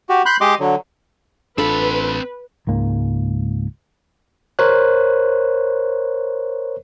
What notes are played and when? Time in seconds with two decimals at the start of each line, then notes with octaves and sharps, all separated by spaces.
0.09 F#4 G4
0.26 B5 C6 F#6 G6
0.41 G#3 G4 D#5 C6 D6
0.60 D3 F#3
1.58 A1 C4 D4 F4 A4 B4 B5
2.67 C#2 G#2 A#3
4.59 A#4 C5 C#5 F#6